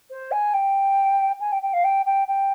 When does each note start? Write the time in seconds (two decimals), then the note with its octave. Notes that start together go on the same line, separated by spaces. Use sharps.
0.10 C5
0.32 G#5
0.54 G5
1.40 G#5
1.52 G5
1.62 G5
1.73 F5
1.84 G5
2.06 G5
2.28 G5